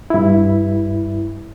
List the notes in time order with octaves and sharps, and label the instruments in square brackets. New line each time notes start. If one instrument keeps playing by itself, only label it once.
[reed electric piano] G2 E4